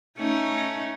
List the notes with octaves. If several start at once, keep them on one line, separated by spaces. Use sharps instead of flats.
A3 C#4 D#4